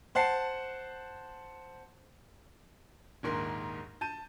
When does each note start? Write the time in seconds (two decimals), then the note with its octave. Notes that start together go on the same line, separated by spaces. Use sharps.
0.15 C5 F#5 A5 C7
3.23 A#1 D#2 G#2 A#4 C6
4.01 A5 G6 D#7